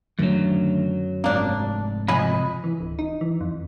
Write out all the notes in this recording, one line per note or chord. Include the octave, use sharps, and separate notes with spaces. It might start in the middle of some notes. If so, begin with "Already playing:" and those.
F#2 D3 D#3 F#3 A3
F1 G#2 A#3 C4 D4
C3 F3 D#5 G#5 B5
E3
D1
D#4
E3
F2